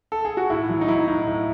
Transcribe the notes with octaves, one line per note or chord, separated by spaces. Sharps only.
A4
G#4
F#4
A2 E4
F#3
D#4
F#3 E4
A2 D#4
A2